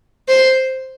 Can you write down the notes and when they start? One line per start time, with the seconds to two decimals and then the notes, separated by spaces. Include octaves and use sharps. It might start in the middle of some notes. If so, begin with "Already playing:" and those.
0.28 C5